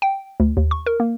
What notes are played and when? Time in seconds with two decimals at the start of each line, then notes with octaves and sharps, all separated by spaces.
0.02 G5
0.40 D2
0.57 D#2
0.71 C#6
0.86 A#4
1.00 A#3